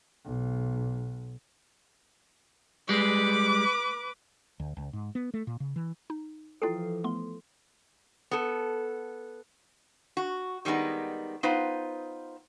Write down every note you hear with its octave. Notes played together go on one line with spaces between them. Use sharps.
B1
G3 G#3 B4 D6
D2
C#2
G#2
B3
A3
A#2
C#3
E3
D#4
E3 F3 E4 F4 A4 G5 C7
A3 B3 C6
B3 A4
F#4
D#3 G3 G#3 B3 D#4
B3 D#4 F4 B4 C5